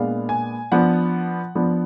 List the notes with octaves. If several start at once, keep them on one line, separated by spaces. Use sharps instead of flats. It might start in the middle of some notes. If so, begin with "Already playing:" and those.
Already playing: A#2 G#3 B3 D4 F5
G#5
F3 B3 D4 F#5
F3 B3 D4